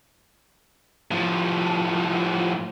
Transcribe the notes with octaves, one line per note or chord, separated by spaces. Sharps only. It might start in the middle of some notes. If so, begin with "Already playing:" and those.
A2 F3